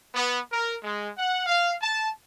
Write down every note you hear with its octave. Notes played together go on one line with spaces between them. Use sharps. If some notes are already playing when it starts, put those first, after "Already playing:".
B3
A#4
G#3
F#5
F5
A5